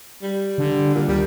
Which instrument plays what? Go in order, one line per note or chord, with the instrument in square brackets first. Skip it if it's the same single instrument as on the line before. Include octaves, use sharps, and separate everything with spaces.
[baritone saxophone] G3
[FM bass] D3
[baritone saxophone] A#2
[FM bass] D#2 [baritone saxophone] G3